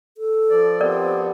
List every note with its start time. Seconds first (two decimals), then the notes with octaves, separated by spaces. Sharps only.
0.17 A4
0.50 F3 D5
0.81 F3 B3 C4 G4 A#4 D5